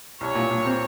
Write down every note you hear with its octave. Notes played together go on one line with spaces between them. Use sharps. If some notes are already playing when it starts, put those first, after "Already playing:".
C2 C#5
A#2
A#2
C4